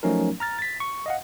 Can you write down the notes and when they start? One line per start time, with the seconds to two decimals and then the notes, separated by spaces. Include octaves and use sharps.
0.03 F3 F#3 A3 C#4 D#4 A#4
0.40 A#5 F6 A6
0.59 A6 B6
0.80 C#6
1.06 D#5 F5 F#5